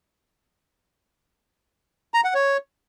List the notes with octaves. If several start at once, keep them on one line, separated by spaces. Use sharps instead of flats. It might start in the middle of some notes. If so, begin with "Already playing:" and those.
A#5
F#5
C#5